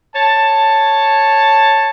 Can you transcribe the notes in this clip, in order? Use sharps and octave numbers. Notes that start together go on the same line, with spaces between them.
C#5 A5